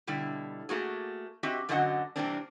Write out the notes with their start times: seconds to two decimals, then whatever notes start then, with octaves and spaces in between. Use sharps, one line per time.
0.07 B2 D3 G3 E4
0.69 A3 A#3 F#4 G#4
1.43 C4 F#4 G4 D#5 E5
1.69 F#2 D3 F#3 F#4 D#5 F#5
2.16 C3 E3 G3 A#3 C4 D4